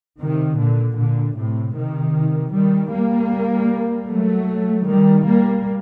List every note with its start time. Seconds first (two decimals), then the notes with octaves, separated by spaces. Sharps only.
0.20 C3 D#3
0.59 A#2 D3
0.97 A#2 D3
1.36 A2 C3
1.76 C3 D#3
2.53 D#3 G3
2.92 G3 A#3
4.09 F#3 A3
4.86 D#3 G3
5.26 G3 A#3